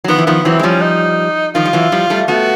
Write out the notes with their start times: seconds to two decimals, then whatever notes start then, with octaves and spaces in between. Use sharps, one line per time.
0.04 F#3
0.08 D#3 F3 B3
0.18 E3
0.27 D#3 F3 B3
0.45 E3 F#3 C4
0.59 G#3
0.63 F3 G3 C#4
0.82 D#4
1.55 D#3 F3 F4
1.66 G3
1.73 E3 F#3
1.92 F3 G3
2.10 G3 A3
2.28 A3 B3 F#4